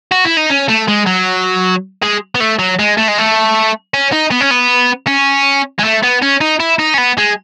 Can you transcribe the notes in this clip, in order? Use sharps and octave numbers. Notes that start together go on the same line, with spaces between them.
F#4
E4
D#4
C#4
A3
G#3
F#3
G#3
B3
A3
F#3
G#3
A3
G#3
A3
C#4
D#4
B3
C#4
B3
C#4
G#3
A3
B3
C#4
D#4
E4
D#4
C#4
B3
G#3